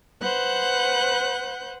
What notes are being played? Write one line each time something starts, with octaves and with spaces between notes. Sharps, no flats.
B4 C5 F#5 F#6 G6